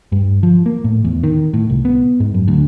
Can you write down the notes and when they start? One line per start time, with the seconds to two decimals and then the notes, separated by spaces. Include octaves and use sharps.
0.12 G2
0.43 F3
0.66 A#3
0.84 A2
1.04 E2
1.24 D#3
1.53 A2
1.70 C2
1.85 B3
2.20 G#2
2.34 F#2
2.48 D2